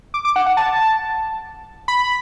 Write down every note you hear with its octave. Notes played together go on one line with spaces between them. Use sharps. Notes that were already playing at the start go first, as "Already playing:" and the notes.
D6
D6
F#5
F#5
A5
B5